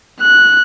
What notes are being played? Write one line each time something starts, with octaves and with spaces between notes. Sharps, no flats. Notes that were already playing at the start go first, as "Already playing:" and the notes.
F#6